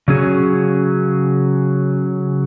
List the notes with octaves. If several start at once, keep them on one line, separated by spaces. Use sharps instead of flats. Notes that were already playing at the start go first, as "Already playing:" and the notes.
C#3 F#3 C#4 G#4